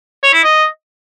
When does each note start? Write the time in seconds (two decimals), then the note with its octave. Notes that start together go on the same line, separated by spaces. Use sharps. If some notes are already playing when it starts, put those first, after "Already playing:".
0.23 C#5
0.33 E4
0.44 D#5